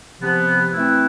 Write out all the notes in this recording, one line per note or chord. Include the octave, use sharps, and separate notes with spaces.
C3 F3 B3
E3 A3 C4 E4 B4